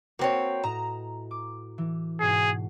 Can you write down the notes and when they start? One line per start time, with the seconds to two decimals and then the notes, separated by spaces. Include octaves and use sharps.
0.19 A#3 C4 F#4 B4 C#5 G5
0.64 A2 D#5 A#5 E7
1.31 D6
1.78 E3
2.20 G#2 B2 G#4 C7